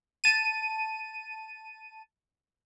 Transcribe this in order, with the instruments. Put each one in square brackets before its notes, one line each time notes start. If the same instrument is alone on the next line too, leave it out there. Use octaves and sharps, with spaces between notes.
[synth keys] A5 D#7